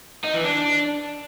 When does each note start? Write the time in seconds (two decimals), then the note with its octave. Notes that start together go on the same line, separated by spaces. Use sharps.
0.24 D#4
0.34 E3
0.44 D4